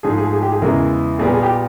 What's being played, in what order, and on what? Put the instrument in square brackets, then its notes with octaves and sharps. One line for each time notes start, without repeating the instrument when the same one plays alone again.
[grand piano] G#2 F3 A3 G#4
G#4
G#4
G4
G#4
E2 C#3 E3 G#3 A#4
A#2 G3 B3 G#4
G#4
G4